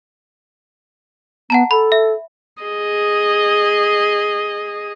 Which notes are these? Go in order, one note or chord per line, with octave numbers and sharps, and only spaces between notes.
B3 F#5 A5 A#5
A4 B5
E5
G#4 D#5